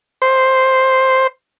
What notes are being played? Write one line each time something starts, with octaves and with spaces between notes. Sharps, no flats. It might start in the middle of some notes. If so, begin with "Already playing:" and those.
C5